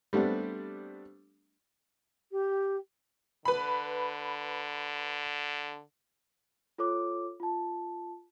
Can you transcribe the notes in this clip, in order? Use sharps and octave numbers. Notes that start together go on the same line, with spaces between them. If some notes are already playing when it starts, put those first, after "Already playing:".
G3 A3 B3 C4 D4
G4
D3 B4 B5
F4 A4 C#5 D6
F4 A5